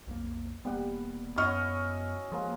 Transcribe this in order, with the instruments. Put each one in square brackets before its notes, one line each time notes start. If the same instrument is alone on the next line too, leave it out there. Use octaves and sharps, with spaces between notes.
[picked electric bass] B1 F2 A#3
[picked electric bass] E1 A#3 B3 [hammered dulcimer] G3 F#5
[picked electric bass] F#2 B3 [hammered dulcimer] C#4 E4 F#4 [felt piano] D#5 C#6 F6
[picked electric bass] F3 [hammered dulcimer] G#3 A#3